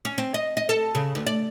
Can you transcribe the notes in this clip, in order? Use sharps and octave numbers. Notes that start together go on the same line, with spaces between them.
C#4
C4
D#5
D#5
A4
C#3
D2
D5